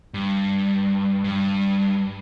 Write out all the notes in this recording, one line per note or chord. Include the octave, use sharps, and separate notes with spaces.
G2
G2